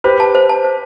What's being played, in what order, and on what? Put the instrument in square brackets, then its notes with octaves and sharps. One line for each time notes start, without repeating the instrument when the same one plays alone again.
[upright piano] G4 B4 [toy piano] C5
[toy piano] A5
C5
A5
C5